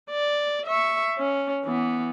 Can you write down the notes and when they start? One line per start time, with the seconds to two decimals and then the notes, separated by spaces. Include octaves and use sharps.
0.10 D5
0.66 E5 C#6
1.18 C#4
1.64 E3 B3